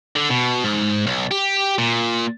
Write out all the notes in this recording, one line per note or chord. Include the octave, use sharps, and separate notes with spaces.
D3
B2
G#2
B1
G4
A#2